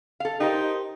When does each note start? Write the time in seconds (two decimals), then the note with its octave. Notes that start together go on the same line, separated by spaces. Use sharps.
0.20 A4 F5
0.40 D#4 G4 A#4 C5